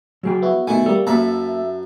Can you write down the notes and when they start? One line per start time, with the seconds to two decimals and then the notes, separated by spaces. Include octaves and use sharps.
0.23 F#3 G#4 G5
0.42 B3 E4 F#4
0.67 B2 D#3 A3 E4 G#5
0.86 G3 A#3 A4
1.07 F#2 A#3 A4 B4 E5 A#5